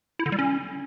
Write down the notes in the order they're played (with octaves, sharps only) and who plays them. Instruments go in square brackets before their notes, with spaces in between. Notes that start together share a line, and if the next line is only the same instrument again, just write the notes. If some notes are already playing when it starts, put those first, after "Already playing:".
[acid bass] E4
D3
G3
C#4